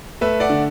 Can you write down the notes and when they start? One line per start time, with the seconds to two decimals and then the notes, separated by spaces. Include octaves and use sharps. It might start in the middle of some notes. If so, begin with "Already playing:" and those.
0.21 A3 B4 E5
0.40 D5 F#5
0.50 D3